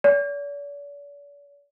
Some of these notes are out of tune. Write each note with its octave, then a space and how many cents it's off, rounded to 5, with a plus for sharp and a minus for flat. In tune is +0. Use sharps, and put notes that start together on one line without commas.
D5 -45